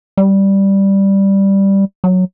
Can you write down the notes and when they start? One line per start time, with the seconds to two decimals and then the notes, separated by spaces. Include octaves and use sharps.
0.17 G3
2.04 F#3